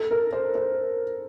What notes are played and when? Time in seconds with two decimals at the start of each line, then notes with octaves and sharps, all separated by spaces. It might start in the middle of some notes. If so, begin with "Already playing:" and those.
Already playing: A4
0.11 A#4
0.32 C5
0.55 C5